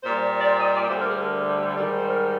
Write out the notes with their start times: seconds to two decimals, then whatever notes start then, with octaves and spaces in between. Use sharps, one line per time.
0.03 A#2 G3 C5
0.40 D5
0.46 C5
0.60 D#5
0.76 D5
0.89 D2 D3 G3 C5
1.00 A#4
1.10 G#4
1.21 A#4
1.76 G#2 D#3 G3 D5
1.97 C5
2.11 A#4